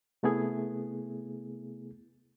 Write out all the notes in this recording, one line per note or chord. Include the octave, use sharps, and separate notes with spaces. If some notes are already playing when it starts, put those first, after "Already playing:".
C3 A3 B3 E4 G#4